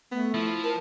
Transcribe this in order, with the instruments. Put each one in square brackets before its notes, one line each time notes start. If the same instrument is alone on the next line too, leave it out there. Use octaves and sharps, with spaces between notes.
[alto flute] A3 [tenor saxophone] B3
[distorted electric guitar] F3 [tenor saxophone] E4
[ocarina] A#4 [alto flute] A5